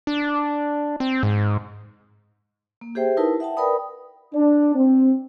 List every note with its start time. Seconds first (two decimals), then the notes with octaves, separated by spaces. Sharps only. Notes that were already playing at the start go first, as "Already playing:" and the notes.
0.07 D4
1.00 C4
1.23 G#2
2.81 A#3
2.95 G4 G#4 C5 E5 G5
3.17 D#4 E4 A#4 B4 A5
3.40 E5 F#5 G5 A5
3.57 A#4 B4 D5 G5 B5 D#6
4.33 D4
4.75 C4